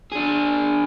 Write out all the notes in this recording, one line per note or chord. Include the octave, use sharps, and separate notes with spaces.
D4 G#4